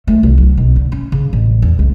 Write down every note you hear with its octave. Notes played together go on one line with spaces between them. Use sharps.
A3
C2
F#3
B1
D3
C#4
C#3
A1
E2
C#2